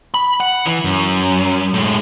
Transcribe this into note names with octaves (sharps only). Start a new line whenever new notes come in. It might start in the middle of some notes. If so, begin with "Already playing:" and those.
B5
F#5
E3
F#2
A2 G#3